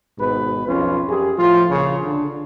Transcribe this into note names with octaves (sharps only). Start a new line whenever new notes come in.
G#1 G#2 B2 B4
B1 F2 C#4 F4
F#2 G4 G#4
A2 F3 F4
A#1 C#3
D3